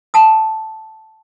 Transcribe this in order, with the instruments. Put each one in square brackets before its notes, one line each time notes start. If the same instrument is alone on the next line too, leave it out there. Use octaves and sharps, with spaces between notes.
[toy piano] F#5 A5 D#6